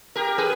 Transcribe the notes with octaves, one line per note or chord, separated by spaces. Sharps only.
G4 A#4
G#4 B4